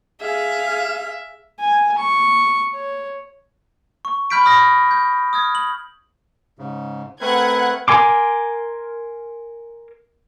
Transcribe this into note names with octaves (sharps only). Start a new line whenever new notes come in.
G#4 E5 F5
G#5
C#6
C#5
C#6
B5 F6 G6 B6 D7
B5 D#6 F6 A#6
G6
D#6 F6 G#6
F#7
G#2 C#3
A3 C4 A#4 B4 F#5 F#6 G#6
A#4 G#5 C6 D6